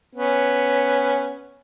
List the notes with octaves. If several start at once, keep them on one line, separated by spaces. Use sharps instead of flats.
B3 C#4